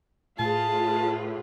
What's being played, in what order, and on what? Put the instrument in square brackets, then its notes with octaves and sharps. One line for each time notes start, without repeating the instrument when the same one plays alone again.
[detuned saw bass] A2 [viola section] F4 G#4 B4 [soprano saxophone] A5